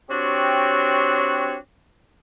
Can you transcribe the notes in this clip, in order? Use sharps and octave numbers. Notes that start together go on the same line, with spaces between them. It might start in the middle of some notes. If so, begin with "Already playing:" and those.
C4 D4 F#4 G4 C#5